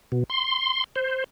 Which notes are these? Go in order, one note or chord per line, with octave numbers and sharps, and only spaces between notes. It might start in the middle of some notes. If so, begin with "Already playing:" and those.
B2
C6
C5